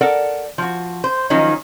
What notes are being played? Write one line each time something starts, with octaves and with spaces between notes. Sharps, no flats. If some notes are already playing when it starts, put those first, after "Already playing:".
A4 A#4 D5 F#5
F3 F#4
C5
D#3 F3 F#3 C#4 D#4